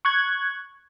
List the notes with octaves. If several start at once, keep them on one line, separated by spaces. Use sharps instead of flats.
C#6 F#6 G#6